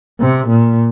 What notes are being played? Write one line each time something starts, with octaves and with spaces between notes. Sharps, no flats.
C3
A#2